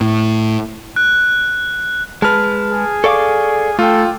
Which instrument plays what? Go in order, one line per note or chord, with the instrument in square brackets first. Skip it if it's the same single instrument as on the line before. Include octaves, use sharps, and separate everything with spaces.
[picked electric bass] A2
[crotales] F#6
[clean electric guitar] G#3 B4 [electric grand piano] A5 F6
[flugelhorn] G#4
[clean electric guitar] A4 D5 F5 [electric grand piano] C#6 D6
[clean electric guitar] A3 [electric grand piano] F4 G5 [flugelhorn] A4